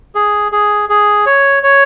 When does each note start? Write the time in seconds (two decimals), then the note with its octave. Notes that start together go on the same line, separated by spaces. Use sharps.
0.15 G#4
0.52 G#4
0.89 G#4
1.26 C#5
1.63 C#5